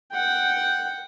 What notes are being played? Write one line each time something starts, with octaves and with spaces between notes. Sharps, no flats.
F#5 G5